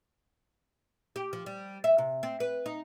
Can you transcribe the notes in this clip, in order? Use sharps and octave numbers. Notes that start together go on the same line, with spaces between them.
G4
F3
G3
E5
C3
C4
B4
D#4